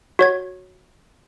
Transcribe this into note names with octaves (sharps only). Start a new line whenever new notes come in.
F#4 C#5 G#6